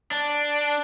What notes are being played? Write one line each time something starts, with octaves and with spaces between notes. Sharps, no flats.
D4